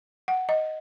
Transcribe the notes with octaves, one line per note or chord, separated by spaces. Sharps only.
F#5
D#5